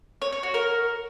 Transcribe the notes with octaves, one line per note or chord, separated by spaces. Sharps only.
C#5
C#5
F#4
A#4